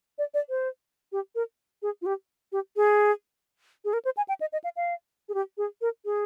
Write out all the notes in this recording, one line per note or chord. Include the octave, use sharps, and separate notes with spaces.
D5
D5
C5
G4
A#4
G#4
F4
G4
G4
G#4
G#4
A#4
C5
G#5
G5
D#5
D#5
F5
F5
G#4
G4
G#4
A#4
G#4